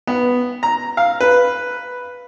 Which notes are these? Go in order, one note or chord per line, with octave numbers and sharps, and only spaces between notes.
B3
A#5
F5
B4